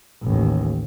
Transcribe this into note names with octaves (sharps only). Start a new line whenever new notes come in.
A1 D#2